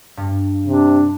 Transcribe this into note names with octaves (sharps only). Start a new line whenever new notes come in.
G2
C3 D4